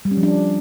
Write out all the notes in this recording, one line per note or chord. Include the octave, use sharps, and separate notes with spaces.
G3
C#4
F3
D4